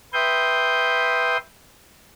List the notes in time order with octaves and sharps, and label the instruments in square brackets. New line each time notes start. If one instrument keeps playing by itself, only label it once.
[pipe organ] B4 E5 G5 C6 D#6 G6